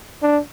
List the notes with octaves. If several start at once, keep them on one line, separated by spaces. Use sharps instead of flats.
D4